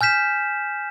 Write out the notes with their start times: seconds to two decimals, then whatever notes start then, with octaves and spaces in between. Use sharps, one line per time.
0.01 G#5 F6 G6 B6 E7